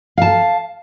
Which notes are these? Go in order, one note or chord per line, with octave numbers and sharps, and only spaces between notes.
F5 A5